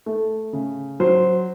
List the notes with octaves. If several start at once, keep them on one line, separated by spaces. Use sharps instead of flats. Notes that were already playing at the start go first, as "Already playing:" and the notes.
A3
C#3
F#3 C5